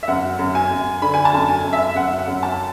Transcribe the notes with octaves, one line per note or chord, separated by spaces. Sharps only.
E5
F#2 F#5
F#2
G#5
F#2
D3 B5
G#5
A5
F#2
G#5
F#2
E5
F#2 F#5
E5
F#5
F#2
A5